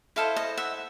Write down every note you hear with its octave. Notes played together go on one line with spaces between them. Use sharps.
E4 A4 C5 D#5 F5
D#5
E5 F#5